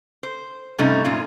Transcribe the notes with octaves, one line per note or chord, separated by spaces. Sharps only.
C5
G2 C3 G3 A3 C#4 D#4
F#2 A#2 C#4 F4